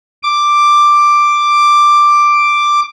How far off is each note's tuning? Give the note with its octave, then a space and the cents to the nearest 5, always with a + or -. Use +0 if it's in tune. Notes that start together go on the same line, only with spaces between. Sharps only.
D6 +5